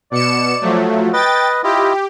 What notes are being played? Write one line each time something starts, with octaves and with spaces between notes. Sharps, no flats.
B2 D5 C#7 E7
F3 F#3 A3
B4 D#5 G5 A6
E4 F4 G4 D#5